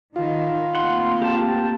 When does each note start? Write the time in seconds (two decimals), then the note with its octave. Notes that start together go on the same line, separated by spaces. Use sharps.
0.16 D#3 F4
0.75 A3 A#3 C4 F#5 C6
1.22 G4 A5